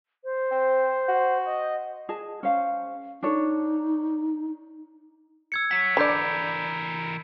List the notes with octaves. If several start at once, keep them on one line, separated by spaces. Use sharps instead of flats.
C5
C4
F#4
D#5
G#4 D#5 A5
C#4 C5 F5
D4 D#4 A4 C#5
E6 G#6 C#7
C#5 F#5 B6
D3 E3 A#4 D5 B5 G6